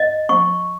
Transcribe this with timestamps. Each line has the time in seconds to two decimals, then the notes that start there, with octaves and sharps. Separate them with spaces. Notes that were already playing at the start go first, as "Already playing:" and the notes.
Already playing: D#5
0.29 C#6